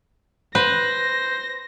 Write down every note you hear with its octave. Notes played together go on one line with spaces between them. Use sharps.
B4 C5 A#6